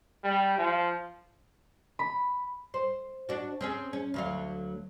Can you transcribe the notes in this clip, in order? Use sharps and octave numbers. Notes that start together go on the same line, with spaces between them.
G3
F3
B5
C5
D4 F#4
C4 C#4 G#4
C#4
D2 F#3 F5